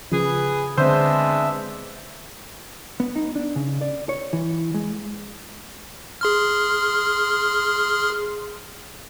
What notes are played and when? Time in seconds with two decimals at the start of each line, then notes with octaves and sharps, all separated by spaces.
0.12 C#3 F3 G#4 B4
0.78 D3 G#3 B3 C4 D4 C5 E5
3.00 B3
3.16 D#4
3.36 D4
3.56 C#3
3.81 D5
4.09 C#5
4.33 E3
4.74 G#3
6.21 G#4 C6 F6